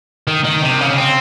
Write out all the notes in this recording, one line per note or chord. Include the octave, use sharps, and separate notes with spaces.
D#3
D#3
C3
C#3
C4